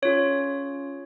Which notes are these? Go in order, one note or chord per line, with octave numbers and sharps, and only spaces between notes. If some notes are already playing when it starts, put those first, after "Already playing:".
C#4 F4 G#4 C#5